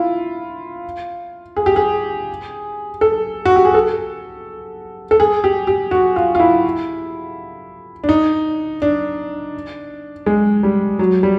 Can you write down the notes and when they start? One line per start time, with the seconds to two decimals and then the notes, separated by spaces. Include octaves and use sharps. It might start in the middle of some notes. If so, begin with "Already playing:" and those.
Already playing: E4 F4
1.57 G#4
1.66 G4
1.76 G#4
3.01 A4
3.45 F#4
3.56 G4
3.65 G#4
3.74 A4
5.11 A4
5.20 G#4
5.44 G4
5.67 G4
5.91 F#4
6.16 F4
6.35 F4
6.40 E4
8.04 D4
8.09 D#4
8.82 D4
10.26 G#3
10.63 G3
10.99 F#3
11.23 G3